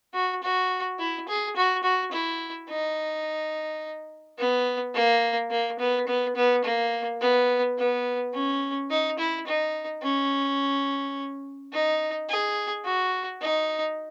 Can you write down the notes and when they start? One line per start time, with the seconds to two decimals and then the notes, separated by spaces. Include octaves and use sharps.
0.14 F#4
0.43 F#4
0.99 E4
1.28 G#4
1.56 F#4
1.83 F#4
2.12 E4
2.69 D#4
4.38 B3
4.95 A#3
5.50 A#3
5.79 B3
6.07 B3
6.36 B3
6.64 A#3
7.20 B3
7.77 B3
8.33 C#4
8.90 D#4
9.18 E4
9.46 D#4
10.03 C#4
11.73 D#4
12.29 G#4
12.85 F#4
13.41 D#4